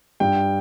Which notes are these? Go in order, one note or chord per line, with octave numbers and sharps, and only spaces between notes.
G2 G5